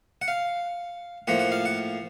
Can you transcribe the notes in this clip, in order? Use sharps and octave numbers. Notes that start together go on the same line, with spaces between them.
F#5
F5
A2 F3 A#3 F#5
F#5
F5
F#5